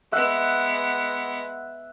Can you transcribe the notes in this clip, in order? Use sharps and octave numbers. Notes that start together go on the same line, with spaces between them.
G#3 B3 E5 F#5 E6